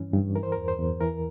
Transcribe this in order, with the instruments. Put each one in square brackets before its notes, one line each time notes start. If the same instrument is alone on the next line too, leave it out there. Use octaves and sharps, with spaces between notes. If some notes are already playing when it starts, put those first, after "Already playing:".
Already playing: [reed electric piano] G2 E3 C#4
G2
E3 A#4
C5
E2 A#4
C5
E2
E3 A#4